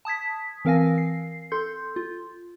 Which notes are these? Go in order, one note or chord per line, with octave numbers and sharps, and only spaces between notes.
A5 D#6 G#6 B6
E3 C4 A#4 F5 G#5 A#6
C7
A4 C6 G6
F4